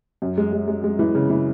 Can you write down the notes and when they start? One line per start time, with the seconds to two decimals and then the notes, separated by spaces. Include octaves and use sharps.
0.22 F#2
0.37 G#3
0.53 G#3
0.68 G#3
0.84 G#3
0.99 E3
1.15 C#3
1.30 E3